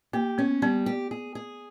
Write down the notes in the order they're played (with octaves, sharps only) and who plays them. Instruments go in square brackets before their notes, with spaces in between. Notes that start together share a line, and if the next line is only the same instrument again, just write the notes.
[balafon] A#3 [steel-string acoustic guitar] G4
[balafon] B3 [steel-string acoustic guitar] C#4
[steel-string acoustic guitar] G3 [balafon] B3
[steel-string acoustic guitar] G4
G#4
G#4